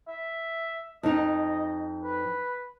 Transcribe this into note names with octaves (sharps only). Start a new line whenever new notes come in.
E5
F2 D#4 D#5
B4